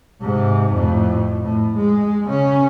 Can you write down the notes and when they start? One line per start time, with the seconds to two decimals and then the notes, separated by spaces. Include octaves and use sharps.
0.21 G#2 C3
0.73 F2 A2
1.42 A2
1.77 G#3
2.25 C#3 C#4